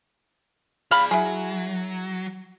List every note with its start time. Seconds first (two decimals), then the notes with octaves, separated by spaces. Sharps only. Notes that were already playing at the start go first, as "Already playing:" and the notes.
0.91 G#4 D5 F5 B5
1.11 F#3 E4 G#4